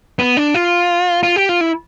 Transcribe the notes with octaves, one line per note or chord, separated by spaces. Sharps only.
B3
D4
F4
F4
G4
F4
E4